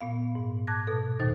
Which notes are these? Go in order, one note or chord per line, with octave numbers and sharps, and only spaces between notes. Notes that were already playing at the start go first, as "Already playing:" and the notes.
A#2 B3 F5
G#2
A5 D6 F#6 G#6 A#6
B2 A4
D#2 A#2 D#3 D#4 C5 A6